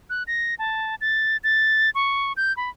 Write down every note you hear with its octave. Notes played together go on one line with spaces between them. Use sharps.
F#6
A#6
A5
A6
A6
C#6
G6
B5